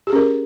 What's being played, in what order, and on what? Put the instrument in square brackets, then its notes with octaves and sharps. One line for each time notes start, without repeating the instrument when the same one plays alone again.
[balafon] G4
G#4
C#4
A#4